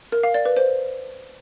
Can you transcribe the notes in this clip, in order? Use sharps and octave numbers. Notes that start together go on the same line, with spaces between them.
A#4
F5
D5
B4
C5